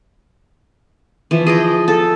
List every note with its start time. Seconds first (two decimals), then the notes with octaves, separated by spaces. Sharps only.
1.31 E3 F3
1.47 G#4 D#5 G5
1.88 A4